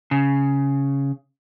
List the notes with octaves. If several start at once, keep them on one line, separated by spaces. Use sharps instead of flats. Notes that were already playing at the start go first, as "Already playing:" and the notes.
C#3